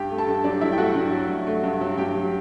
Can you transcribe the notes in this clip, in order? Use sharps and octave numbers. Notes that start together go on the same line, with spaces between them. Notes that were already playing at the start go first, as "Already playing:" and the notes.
Already playing: G2 G4 G5
A3
A4 A5
G2
F#3 D4 D5
G2 E4 E5
G5
A3 F#4 F#5
G2
F#3
G2
A3
G2
F#3
G2 G4 G5
F#3